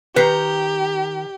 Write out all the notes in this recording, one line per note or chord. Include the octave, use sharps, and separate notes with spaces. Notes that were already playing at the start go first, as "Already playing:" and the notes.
D#3 G4 B4 A#5 B6 C7